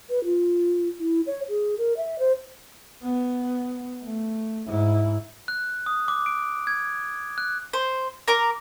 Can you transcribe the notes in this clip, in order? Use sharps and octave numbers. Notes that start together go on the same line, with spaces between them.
B4
F4
E4
C#5
G#4
A#4
E5
C5
B3
A3
G#2 E4
F#6
D#6
D6
D7
G#6
F#6
C5
A#4 A#5 D6